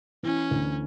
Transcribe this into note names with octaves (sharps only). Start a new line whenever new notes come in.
E3 C#4
D2